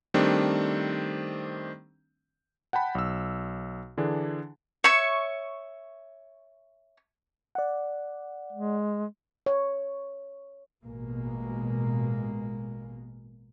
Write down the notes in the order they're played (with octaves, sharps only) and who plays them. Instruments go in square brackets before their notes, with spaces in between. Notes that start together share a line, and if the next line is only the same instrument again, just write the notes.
[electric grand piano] D#3 G3 A3 C4 D4
F#5 G5 A5 B5
B1 E6
D3 E3 D4 G#4
[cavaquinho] C#5 E5 C#6
[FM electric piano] D5 F#5
[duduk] G#3
[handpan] C#5
[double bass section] A1 B2 G#3 A#3